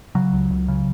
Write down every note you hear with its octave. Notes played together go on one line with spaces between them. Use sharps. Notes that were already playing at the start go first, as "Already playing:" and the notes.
C#3 F#3
C#2
C#2
C#3